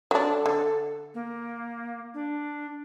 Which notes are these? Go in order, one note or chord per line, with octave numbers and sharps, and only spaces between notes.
F#3 D4 A4
D3
A#3
D4